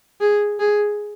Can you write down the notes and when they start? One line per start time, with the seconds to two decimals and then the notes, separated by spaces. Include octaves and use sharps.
0.21 G#4
0.59 G#4